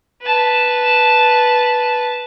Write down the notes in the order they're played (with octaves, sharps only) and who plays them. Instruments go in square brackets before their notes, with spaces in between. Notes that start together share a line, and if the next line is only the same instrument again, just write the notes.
[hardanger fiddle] B4 A5